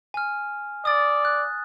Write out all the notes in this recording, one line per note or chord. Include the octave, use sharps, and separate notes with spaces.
G#5 F6
D5 D#6 A6
F#6